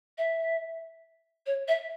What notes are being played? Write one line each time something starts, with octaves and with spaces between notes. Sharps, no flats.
E5
C#5
E5